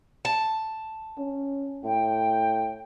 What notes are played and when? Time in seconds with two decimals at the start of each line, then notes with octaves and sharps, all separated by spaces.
0.25 A5
1.18 C#4
1.84 A2 G5